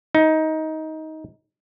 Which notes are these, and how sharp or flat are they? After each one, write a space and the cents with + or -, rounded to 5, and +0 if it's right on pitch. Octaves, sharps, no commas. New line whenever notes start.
D#4 +15